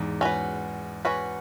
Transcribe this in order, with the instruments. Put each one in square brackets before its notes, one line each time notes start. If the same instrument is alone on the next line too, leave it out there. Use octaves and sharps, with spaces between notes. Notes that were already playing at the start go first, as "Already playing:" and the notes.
Already playing: [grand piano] E2 G#2
[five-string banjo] C#4 F#4 B4
C#4 F#4 B4